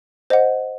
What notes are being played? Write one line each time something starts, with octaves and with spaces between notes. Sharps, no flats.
C5 D#5 F#5